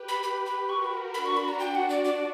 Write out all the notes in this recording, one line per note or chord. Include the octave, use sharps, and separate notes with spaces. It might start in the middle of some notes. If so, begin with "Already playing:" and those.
Already playing: G4 B4
B5
B5
B5
F#4 A#4 C#6
B5
D4 F#4 B5
C#6
B5
A#5
G5
F#5
D5
D5